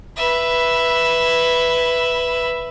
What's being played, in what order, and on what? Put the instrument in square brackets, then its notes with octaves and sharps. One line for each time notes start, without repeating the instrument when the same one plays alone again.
[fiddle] B4 E5